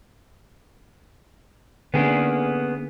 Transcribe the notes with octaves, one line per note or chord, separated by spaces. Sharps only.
D3 A#3 B3 C#4 G#4